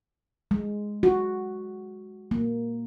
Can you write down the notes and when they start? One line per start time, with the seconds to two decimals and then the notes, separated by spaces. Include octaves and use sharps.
0.51 G#3
1.03 F#4
2.31 A#3